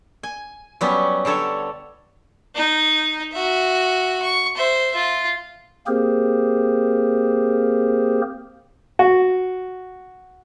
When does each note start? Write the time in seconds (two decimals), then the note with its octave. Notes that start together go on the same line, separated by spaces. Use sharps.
0.23 G#5
0.81 F#3 G3 B3 C#4
1.25 D3 G3 A4 C#5
2.55 D#4
3.32 F#4 E5
4.22 C#6
4.55 C5 E5
4.95 F4
5.87 A#3 C4 G4 G#4 A#4 C5
8.99 F#4